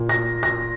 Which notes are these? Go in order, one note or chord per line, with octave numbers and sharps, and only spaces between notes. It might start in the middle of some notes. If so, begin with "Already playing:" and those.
Already playing: A#2
A#6
A#6